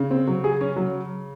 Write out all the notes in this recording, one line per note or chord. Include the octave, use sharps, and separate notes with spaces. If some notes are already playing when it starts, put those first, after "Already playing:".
Already playing: C#3
C4
F#3
G#4
C#4
F#3